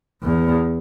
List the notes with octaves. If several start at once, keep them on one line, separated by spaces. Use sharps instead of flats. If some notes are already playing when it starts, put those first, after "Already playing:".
E2